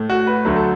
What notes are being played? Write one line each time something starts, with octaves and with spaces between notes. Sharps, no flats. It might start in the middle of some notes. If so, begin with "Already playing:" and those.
Already playing: A2 A3
F#4
B4
D2 D3 F#3 A3
A4